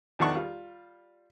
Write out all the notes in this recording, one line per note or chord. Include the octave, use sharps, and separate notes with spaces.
E2 D#3 F3 D4 F#5 C#6
G3 F4